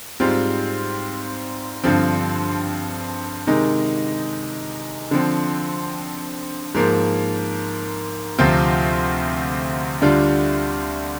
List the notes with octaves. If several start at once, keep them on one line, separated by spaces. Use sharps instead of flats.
G#2 G3 C4 F4
G2 D3 F3 C4
C3 D#3 G#3 D#4
D3 F3 C4
G#2 F3 A#3
D2 C3 F3 C4 F4
D2 D3 G3 D4 F4